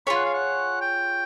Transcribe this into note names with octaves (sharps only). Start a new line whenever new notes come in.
F4 G#4 C#5 B5
F#5
F5
F#5
G5